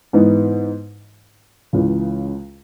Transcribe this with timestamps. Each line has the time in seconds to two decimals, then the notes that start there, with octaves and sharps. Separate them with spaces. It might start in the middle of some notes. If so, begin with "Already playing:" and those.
0.13 G#2 E3 B3 D#4
1.73 C#2 C#3 E3